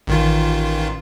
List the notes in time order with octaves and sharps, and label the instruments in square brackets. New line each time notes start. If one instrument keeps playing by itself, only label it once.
[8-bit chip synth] A1 D#3 F4